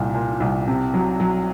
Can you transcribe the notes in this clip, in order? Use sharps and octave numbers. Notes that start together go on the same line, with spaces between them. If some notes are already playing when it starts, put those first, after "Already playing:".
Already playing: C2 A#2
A#2
C2
C3
F#3
F#3